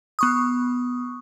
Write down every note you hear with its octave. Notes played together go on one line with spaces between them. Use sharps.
B3 C#6 D#6